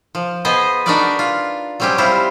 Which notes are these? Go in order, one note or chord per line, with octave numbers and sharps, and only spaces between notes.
F3
B3 G#4 C5 D#5
D4 D#4 F#4 A#4 B4 D5
F4
F#3 G3 C4 C#4 G4
G3 C4 E4 F4 C5